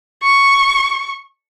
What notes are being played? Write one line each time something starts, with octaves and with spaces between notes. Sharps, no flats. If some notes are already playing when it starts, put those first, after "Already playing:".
C#6